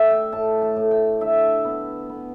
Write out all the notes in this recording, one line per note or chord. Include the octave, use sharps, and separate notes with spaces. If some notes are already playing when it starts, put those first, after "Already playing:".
Already playing: A3 D5 E5
G5
A2 A5
A5
A2
G5
D3 E5
B3
B3